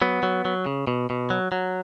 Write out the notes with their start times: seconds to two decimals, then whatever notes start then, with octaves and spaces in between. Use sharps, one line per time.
0.02 F#3 B3
0.23 F#3
0.45 F#3
0.66 C#3
0.87 B2
1.10 B2
1.30 F#3
1.52 F#3